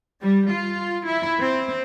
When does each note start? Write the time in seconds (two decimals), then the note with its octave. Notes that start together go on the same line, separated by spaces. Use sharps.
0.22 G3
0.51 F4
1.06 E4
1.41 C4